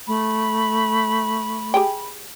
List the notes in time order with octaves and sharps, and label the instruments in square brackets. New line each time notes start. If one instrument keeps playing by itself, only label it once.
[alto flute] A3 [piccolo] B5
[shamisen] G4 G#4 G5